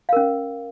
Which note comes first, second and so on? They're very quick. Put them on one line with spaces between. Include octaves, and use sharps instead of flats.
F5 A#4 C#4